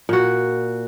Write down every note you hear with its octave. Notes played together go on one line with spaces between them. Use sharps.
A#2 F#4